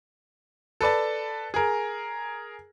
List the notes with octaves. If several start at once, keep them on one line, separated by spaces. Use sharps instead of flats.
A4 B4 D5 A5
G#4 A#4